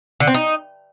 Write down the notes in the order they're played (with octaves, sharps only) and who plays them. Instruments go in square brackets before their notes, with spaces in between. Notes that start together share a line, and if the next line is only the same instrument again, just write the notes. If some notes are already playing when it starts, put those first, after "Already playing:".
[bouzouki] D3
C4
D#4